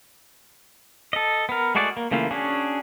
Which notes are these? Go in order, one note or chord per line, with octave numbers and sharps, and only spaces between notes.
A4 D#5
B3 A#4
G#3 A3 F#4 G#4 D5
A#3
C#3 E3 A3 A#3 F4
C#4 D4 F#4 G#4